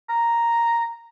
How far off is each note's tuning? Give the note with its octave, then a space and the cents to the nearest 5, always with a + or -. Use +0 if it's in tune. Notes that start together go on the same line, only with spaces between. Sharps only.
A#5 +0